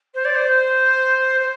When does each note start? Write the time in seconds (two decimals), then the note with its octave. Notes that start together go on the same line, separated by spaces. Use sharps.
0.14 C5
0.24 D5
0.34 C5
1.39 C5